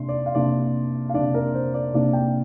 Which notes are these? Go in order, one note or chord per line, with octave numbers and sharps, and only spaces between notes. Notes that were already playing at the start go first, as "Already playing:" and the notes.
Already playing: C3 A#3 D4 C6
D5
F5
C3 A#3 D4 D5
F5
C3 A#3 D4 D5
A#4
C5
D5
C3 A#3 D4 D5
G5